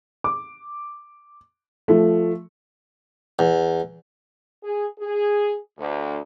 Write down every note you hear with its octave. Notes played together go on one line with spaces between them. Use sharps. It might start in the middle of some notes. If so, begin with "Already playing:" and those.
D6
F3 A3
E2
G#4
G#4
D2